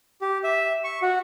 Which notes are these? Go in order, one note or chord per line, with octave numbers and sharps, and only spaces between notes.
G4
E5
C#6
F#4